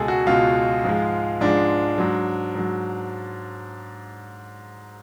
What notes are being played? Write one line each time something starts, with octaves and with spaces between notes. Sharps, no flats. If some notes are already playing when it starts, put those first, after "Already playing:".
Already playing: C#2 B2 G#3 G#4 A4
F#4
C#2 B2 G#3 F4
G#2 F3 G#3
G#2 F3 G#3 D4
G#2 F#3
G#2 F#3